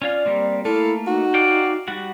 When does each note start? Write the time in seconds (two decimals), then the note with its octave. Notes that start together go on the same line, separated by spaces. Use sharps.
0.02 C#4 F4 D5 F5
0.26 G3 A#3 C4
0.65 A3 A#3 E4 A4 F5
1.07 D#4 F#4
1.34 D5 F5 G5
1.88 G3 F#4 F#5